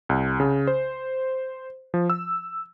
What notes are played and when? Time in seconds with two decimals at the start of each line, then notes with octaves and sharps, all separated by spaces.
0.09 C2
0.40 C#3
0.67 C5
1.94 F3
2.10 E6